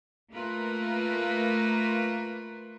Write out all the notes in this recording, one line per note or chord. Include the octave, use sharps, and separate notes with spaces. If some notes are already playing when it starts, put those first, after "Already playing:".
A3 A#3 F4 A#4 B4